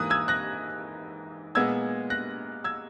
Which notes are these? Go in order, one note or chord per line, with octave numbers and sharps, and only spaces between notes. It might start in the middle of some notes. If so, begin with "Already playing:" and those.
Already playing: G#2 E3 A#3 D#6 F#6
E6 G#6
F#6 A#6
A#2 G#3 B3 E6 G#6
F#6 A#6
E6 G#6